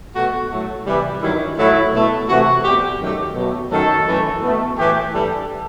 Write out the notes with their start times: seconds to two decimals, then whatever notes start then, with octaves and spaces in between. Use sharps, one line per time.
0.15 B2 A3 F#4
0.50 A2 F#3 A3
0.86 C3 E3 G3
1.21 G2 D#3 F#3 E4
1.57 A2 F#3 A3 E4
1.92 B2 A3
2.28 C3 E3 A3 F#4
2.64 B2 G3 G4
2.99 F#2 D#3 F#3 A3 G4
3.34 B2 F#3 A3
3.70 F#2 D#3 F#3 A3 A4
4.06 F#2 E3 A3
4.41 B2 A3
4.77 A2 E3 A3 G4
5.13 G2 E3 G3 A4